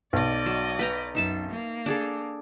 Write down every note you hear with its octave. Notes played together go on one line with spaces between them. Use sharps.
B1 D5 D#5
F#3
B4 G5 A#5
F#2 D#4 E5 A5
A#3
D4 G#4 A4